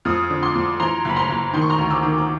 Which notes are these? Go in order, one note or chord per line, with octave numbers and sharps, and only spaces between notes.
F2 D#6 F6
D3
C6 D6
F2
E3 A#5 C6
F#1 B5
A#5 C6
F#1
D#3 C6
C#6
A#5 C6
D2
D6 E6
D#3
D6